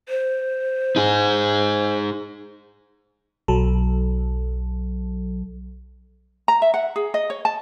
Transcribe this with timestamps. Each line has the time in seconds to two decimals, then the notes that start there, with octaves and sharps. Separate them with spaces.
0.09 C5
0.96 D#4 G#4
3.48 B1 F#3 A4
6.48 A#5
6.62 E5
6.74 F#5
6.96 G#4
7.14 D#5
7.30 C#5
7.45 A5